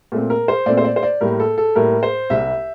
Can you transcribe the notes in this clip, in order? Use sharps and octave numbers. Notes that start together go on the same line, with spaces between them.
A#2 A3 C4
A#4
C5
A#2 A3 C4 D5
C5
D5
C5
D5
A2 G3 A#3 A#4
A4
A4
A2 G3 A#3 A#4
C5
C2 C3 G3 E5